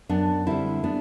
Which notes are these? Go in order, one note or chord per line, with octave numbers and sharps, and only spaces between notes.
F#2 B3 D4
D3 G3 C4 E4
B3 D4